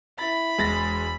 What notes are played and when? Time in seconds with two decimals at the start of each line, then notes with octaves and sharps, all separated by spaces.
0.19 E4 B5 A6
0.58 E1 G#3 A6 A#6